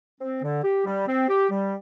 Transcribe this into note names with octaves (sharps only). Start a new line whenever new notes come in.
C4
D3
G4
G3
C4
G4
G3